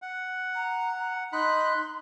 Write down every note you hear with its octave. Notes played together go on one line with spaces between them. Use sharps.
F#5
A#5
D#4 B5 C6 F#6